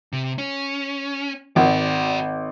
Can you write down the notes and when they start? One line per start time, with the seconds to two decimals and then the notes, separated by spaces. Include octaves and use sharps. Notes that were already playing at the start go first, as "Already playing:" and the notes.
0.13 C3
0.38 C#4
1.56 G#1 F#4 D5